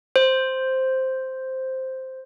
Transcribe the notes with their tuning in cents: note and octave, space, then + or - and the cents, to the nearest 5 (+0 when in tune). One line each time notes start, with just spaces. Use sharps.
C5 +0